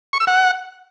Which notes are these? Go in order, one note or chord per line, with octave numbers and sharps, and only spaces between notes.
C#6
E6
F#5